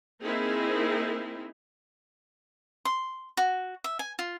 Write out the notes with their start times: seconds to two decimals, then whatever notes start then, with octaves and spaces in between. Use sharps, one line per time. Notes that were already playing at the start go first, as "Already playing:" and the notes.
0.22 A#3 C4 D#4 E4 G#4 A#4
2.85 C6
3.37 F#4
3.84 E5
3.99 G#5
4.19 F4